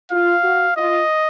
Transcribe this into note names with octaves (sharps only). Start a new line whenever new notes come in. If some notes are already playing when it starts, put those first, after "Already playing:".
F4 F5
F#4
F4 D#5